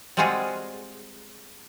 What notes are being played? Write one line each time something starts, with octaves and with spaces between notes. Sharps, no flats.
G3 G#3 C4 F4 F#4 G#4